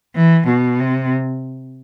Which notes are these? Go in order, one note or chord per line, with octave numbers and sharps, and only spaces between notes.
E3
B2
C3